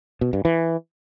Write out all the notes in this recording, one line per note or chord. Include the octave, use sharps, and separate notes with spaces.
B2
G2
E3